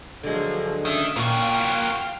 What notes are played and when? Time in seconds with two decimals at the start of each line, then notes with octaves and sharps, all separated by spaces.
0.23 D3 F3 F#3 G#3
0.85 D#3 C#4 E5
1.16 A#2 A#3 F#4 F5 G5